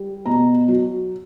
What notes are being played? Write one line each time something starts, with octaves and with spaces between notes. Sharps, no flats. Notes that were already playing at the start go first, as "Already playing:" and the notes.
Already playing: G3
B2 A#5
F#3